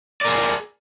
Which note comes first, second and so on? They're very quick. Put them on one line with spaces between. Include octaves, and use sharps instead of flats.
D5 A#4 G#4